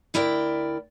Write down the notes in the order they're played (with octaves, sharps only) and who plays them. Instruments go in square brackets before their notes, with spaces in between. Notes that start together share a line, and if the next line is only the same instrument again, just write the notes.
[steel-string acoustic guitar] D2 E4 A#4 D5 G5